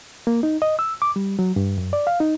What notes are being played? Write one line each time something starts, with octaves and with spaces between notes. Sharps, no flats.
A#3
D#4
D#5
E6
D6
G3
F#3
G2
F#2
D5
F5
D#4